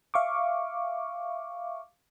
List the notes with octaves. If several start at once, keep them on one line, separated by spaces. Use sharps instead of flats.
E5 F5 C#6 D6